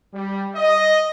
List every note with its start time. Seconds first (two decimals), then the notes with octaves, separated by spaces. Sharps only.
0.13 G3
0.55 D#5